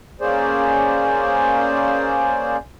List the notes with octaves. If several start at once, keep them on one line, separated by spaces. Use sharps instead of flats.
A#3 C#4 G#4 C5 D5